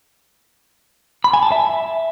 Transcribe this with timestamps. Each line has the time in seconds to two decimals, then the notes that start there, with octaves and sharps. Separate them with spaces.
1.24 B5
1.33 G#5
1.43 A5
1.52 E5